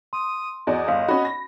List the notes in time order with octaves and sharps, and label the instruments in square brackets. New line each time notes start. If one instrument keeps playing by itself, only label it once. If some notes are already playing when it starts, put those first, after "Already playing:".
[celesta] C6 [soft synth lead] D#6
[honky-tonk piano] E2 F#4 D5 [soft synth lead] D#5
[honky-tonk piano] G1 [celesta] F5
[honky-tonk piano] C#4 F#4 [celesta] B5
[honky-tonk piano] A#6